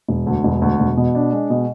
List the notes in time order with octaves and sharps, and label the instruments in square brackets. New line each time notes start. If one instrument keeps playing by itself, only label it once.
[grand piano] E1
D2
E1
D2
E1
B2
D4
G#3
B2